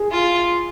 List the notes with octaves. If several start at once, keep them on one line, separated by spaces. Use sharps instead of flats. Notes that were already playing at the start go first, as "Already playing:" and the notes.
Already playing: G#4
F4